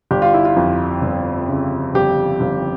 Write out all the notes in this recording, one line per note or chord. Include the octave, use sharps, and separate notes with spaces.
G1 G4
F4
E4
F4
F2
G1
C#3
G1 G4
G1